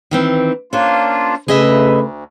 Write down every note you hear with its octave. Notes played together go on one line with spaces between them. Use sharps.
D#3 E3 C4
A#3 C#4 D4 F4 C5
D2 C#3 A3 G#4 B4 D#5 E5